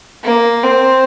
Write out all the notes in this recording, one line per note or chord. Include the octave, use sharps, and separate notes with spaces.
A#3
C4